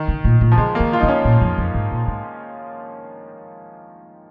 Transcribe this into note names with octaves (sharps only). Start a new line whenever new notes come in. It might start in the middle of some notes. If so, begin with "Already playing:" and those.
Already playing: D#3
C#3
A#2
A#2
F3
C#3 G#3
D#3 A#3
F4
D#4
C#3
C#4
A#2
F2
F2
G#2
A#2
G#2